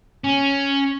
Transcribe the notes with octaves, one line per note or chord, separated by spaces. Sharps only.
C#4